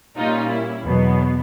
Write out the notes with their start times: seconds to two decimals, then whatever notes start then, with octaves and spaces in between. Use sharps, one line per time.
0.17 A#2 G3 A#3 C#4 D#4 F4
0.51 E4
0.85 E2 B2 F#3 B3